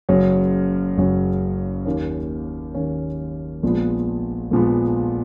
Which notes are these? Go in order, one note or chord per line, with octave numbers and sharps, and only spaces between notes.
F#1 F#2 C#3 F#3 C#4
F#1 F#2 C#3 F#3 C#4
D#2 D#3 A#3 C#4
D#2 D#3 A#3 C#4
A#1 A#2 F3 G#3 B3
A#1 A#2 F3 G#3 B3